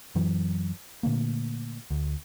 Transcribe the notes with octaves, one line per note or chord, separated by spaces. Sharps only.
F#2 E3 F#3
A#2 D3 A3 A#3
D2